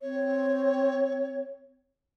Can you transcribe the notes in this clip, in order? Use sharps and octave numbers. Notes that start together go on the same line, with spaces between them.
C4 C#5